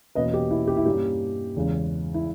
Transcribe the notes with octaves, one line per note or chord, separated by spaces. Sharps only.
E2 B2 A#3 C#4 B4 D#5
G4
E4
G4
E4
G2 G3 A#3 C#4 G4
E2 C#3 G#3 C#4
E4